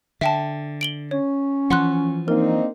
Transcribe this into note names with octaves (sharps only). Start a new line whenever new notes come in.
D3 E5 G5 A5
D7 F#7 G7
C#4 C#5
E3 F3 F#5 C6 F#6
A#3 C4 D4 D#4 A#4